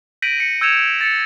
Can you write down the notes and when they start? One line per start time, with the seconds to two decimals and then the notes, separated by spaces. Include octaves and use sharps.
0.22 G6 A#6 B6 D7 D#7 F#7
0.40 C#7
0.61 E6 G6 G#6 C#7 E7 F7
1.01 A6 C#7